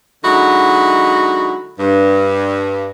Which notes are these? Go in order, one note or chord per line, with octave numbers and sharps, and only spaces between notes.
D3 F#3 G#3 D#4 E4 F#4
G2